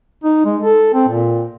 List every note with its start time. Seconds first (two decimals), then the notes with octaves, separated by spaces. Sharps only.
0.24 D#4
0.45 G#3
0.62 A4
0.94 C4
1.09 A#2